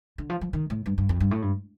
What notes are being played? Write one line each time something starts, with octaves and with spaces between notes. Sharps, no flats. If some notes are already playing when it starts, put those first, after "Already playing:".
D3
F3
F3
D#3
A2
G2
G2
F2
G2
A2
G2